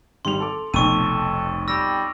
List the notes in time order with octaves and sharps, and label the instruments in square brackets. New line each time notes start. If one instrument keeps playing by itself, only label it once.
[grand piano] G#1 G3 F7 [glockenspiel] C6
[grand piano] A4 D6
[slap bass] F1 [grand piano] B1 F2 [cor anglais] A4 [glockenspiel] C#6 D#7
[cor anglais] G3 [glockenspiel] E6 A#6